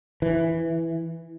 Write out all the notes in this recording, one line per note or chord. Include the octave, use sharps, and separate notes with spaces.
E3